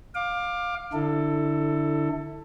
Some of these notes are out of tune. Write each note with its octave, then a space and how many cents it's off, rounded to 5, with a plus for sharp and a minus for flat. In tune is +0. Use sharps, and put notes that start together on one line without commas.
F5 +20 D6 +20
D3 +0 E4 -15 A4 +20